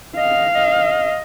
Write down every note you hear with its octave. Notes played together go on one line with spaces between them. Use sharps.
D#5 F5
D#5